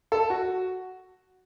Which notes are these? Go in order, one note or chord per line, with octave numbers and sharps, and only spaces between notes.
A4
F#4